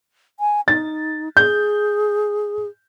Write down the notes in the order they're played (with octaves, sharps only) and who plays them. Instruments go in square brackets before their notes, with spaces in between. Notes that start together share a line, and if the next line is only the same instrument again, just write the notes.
[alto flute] G#5
[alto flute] D#4 [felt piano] A6
[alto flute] G#4 [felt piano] G6